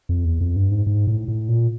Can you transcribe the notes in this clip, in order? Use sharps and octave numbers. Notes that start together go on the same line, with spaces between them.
F2
E2
F2
G2
G#2
G#2
A2
A2
A#2